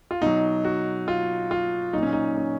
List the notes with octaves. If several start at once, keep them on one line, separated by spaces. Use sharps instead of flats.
F4
B2 F#3 D#4
F#4
F4
F4
A#2 F#3 D#4
C#4
D#4
C#4